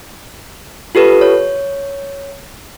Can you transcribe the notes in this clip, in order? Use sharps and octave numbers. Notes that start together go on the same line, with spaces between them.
F4 G4 A4 B4
C#5